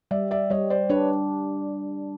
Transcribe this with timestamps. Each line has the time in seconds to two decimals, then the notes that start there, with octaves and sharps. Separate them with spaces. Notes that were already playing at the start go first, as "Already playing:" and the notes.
0.11 G3 D5 E5
0.31 D5 E5
0.50 G3 C#5 D#5
0.70 C5 D5
0.90 D4 B4 C#5